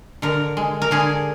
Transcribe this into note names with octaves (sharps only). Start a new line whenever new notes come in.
D3 A#4
G#3
A#4
D3 G#4